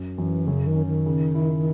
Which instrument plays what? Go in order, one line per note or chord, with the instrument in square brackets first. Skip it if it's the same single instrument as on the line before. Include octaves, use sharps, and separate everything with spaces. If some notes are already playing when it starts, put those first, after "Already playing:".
Already playing: [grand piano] F#2
[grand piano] F#2 [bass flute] E3
[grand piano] F#2 [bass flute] C#3
[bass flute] D#3
[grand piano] C#4
[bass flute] D#3
[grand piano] C#3
E4